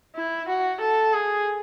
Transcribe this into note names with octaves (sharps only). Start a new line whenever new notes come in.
E4
F#4
A4
G#4